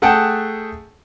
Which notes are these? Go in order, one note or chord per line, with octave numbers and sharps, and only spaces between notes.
A3 G#4 F#5 G5 A5